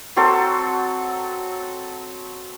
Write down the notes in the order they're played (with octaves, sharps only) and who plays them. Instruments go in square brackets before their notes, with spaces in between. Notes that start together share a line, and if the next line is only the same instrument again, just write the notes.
[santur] F#3 C4 A4